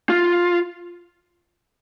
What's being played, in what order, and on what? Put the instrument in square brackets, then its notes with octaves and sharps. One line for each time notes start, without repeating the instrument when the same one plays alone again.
[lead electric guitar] F4